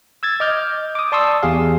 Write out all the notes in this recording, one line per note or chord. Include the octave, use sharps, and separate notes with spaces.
E6 G#6 A6
D#5 D6 F6 G6
D6 D#6
D5 A5 C6 C#6 D#6 E6
E2 G4 G#4 F5